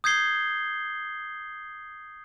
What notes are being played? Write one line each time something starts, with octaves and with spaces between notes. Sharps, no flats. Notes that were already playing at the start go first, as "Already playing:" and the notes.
D#6 G6 G#6 C7 G7